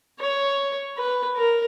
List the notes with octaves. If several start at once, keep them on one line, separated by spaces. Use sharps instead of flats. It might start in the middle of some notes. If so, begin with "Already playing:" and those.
C#5
B4
A#4